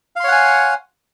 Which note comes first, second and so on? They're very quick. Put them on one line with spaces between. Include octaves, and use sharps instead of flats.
F5 C6 C#5 F#5 G#5